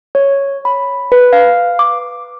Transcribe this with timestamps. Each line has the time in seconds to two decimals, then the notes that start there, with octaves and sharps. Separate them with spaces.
0.15 C#5
0.65 B5
1.12 B4
1.33 F5
1.79 D6